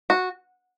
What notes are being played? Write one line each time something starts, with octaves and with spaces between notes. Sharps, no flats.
F#4